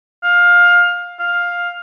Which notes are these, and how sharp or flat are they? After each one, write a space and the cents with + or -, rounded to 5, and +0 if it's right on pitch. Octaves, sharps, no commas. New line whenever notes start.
F5 +15
F5 +10